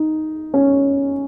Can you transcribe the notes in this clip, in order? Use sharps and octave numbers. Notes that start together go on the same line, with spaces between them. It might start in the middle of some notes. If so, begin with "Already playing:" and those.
Already playing: D#4
C#4